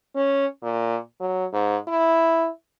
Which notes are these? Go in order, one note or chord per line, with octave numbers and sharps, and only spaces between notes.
C#4
A#2
F#3
G#2
E4